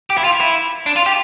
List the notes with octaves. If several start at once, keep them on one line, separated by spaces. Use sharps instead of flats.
G4
E4
F4
E4
D4
F4
G4